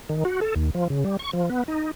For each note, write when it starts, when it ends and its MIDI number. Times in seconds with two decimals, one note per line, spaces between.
0.09 0.24 51
0.25 0.40 66
0.41 0.54 69
0.56 0.70 39
0.75 0.88 53
0.90 1.04 49
1.05 1.17 55
1.19 1.31 85
1.33 1.50 53
1.50 1.63 59
1.68 1.91 63